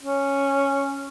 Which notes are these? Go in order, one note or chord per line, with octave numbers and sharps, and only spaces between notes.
C#4